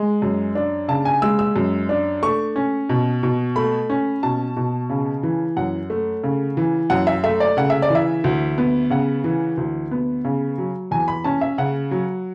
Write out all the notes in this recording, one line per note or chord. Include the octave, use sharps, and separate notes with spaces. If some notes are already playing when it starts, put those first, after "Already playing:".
Already playing: G#3
F#2
D4
C#3 A5
G#5
G#3 E6
E6
F#2
D4
A3 C#6
C#4
B2
B2
A3 B5
C#4
B2 A5
B2
C#3
E3
F#2 F#5
A3
C#3
E3
F#2 F#5
E5
A3 E5
D5
C#3 F#5
E5
D5
E3 E5
D2
B3
C#3 F#5
E3
D2
B3
C#3
F#3
E2 G#5
B5
C#4 A5
E5
C#3 F#5
F#3